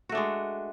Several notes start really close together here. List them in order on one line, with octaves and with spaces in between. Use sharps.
F#4 A3 D4 G#3